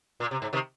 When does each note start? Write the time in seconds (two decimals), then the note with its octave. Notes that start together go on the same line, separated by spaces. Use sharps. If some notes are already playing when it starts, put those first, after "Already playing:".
0.20 A#2
0.31 C3
0.42 G#2
0.53 C3 D#3